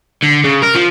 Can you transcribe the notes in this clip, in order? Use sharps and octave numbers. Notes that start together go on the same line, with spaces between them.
D3
C#3
A#4
F3